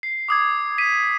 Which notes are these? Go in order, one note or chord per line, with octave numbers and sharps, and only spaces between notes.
C7
D6 D#6 G#6
B6 D#7